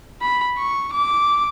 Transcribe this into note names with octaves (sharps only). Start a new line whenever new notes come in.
B5
C#6
D6